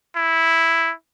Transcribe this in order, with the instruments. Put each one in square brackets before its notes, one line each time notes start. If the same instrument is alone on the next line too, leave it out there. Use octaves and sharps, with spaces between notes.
[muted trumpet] E4